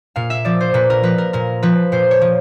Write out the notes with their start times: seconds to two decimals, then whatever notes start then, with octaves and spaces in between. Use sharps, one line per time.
0.16 A#2 F5
0.30 E5
0.45 F3 D5
0.61 C5
0.74 A#2 B4
0.90 A#4
1.03 F3 B4
1.18 A#4
1.33 A#2 A#4
1.63 F3 B4
1.92 A#2 C5
2.11 C#5
2.21 F3